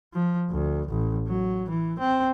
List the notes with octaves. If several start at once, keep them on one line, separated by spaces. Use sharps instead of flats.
F3
D2
A1
F#3
E3
C4